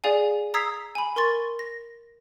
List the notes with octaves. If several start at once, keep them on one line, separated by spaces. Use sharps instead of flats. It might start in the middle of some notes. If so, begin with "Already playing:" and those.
G#4 D5 F5 G#5
A#5 D#6 E6 G#6 B6 C7
G#5 B5
A#4 C6 C#6 A6
A#6